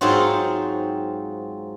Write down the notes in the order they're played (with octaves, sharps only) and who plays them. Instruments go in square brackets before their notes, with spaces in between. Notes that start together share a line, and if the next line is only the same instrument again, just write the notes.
[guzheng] G#2 F#3 C4 D#4 F4 F#4